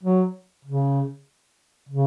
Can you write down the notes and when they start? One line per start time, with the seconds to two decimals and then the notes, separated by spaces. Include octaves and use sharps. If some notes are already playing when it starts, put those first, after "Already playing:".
0.03 F#3
0.65 C#3
1.89 C#3